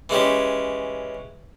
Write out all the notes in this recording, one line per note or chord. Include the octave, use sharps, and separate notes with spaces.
E3 G#3 C#4 G4